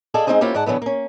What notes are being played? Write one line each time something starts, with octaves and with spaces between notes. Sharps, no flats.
G#4 A4 D5 D#5 F5 G#5
G#3 B3 C4 D#4 G#4 C5
A#3 C#4 E4 F4 G4 C5
G#2 D5 F#5 A5
D3 E3 F#3 A3 B3
A#3 C#4